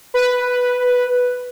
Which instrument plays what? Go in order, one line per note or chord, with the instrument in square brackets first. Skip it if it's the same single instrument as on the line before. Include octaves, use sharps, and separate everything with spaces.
[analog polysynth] B4